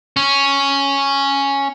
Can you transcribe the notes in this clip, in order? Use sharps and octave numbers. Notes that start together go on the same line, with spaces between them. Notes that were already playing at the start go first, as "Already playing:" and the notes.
C#4